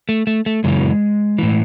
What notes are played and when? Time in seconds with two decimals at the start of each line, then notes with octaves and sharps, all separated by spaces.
0.09 A3
0.27 A3
0.46 A3
0.64 F#2 C#3 E3 G#3
1.38 A2 E3